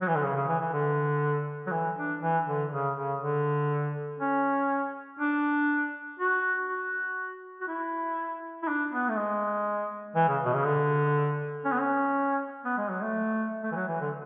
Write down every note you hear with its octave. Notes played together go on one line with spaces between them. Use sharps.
F#3
E3
D3
C#3
C#3
E3
E3
D3
F#3
E3
D4
E3
D3
C#3
C#3
D3
C#4
D4
F#4
F#4
F#4
E4
E4
D4
B3
A3
G#3
E3
C#3
B2
C#3
D3
C#4
B3
C#4
B3
G#3
F#3
A3
A3
E3
F#3
E3
D3